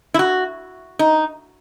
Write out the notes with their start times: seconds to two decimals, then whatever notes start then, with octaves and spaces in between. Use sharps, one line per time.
0.14 E4
0.19 F#4
0.99 D#4